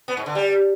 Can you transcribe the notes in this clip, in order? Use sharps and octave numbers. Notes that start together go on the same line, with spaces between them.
B3
G#2
D3
G3